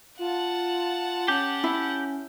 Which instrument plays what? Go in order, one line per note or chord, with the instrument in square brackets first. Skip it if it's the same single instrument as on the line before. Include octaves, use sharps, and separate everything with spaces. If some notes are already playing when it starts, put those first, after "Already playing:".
[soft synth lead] F4 [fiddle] F#5 A5
[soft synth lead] C#4 [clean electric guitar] G4
[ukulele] E4